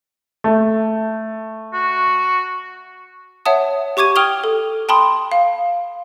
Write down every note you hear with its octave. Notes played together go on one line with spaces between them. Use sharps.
A3
F#4
C#5 E5 F#5 A5 D#6
G4 C#6 D6 G#6 D#7
G5 D#6 F6 F7 G7
A4
G5 A5 B5 C6 D#6
F5